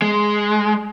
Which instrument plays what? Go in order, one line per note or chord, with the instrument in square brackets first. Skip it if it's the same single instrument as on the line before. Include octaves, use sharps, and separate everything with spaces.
[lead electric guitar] G#3